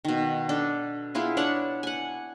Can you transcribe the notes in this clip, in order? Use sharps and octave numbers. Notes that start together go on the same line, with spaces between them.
B2 D#3
D4 A4
B3 E4 F4 G#4
D4 C#5 F#5 A5
F#5 G#5